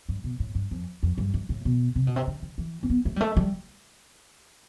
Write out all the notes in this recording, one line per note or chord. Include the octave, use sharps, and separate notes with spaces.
G2
B2
A2
G2
F2
F2
G2
G2
A2
B2
C3
B2
C3
D3
D3
E3
C4
B3
A3
G3
A3
G3